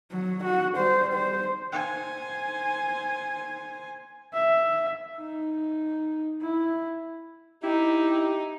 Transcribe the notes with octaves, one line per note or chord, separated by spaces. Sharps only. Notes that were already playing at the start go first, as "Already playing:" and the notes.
F#3
F#4
G3 C5
C5
C5 G#5
E5
D#4
E4
D#4 E4 G4